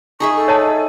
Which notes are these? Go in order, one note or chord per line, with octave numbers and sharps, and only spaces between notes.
D#4 G#4 E5 C#6
A4
C#5 D#5 A5